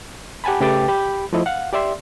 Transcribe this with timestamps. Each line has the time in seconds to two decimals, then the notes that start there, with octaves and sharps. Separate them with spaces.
0.44 G4 F#5 G#5 A5 B5
0.61 C#3 A3 G4 B4 G5 A6
0.88 G4 B5 G6
1.33 F3 A3 E4 D#5
1.46 F5 F#5
1.73 G4 D5 E5 C6